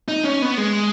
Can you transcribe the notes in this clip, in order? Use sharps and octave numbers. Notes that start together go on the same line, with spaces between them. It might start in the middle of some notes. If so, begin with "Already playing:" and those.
D#4
C#4
B3
G#3